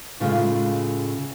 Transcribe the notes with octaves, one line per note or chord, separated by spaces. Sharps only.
A2 C#3 G#3 F4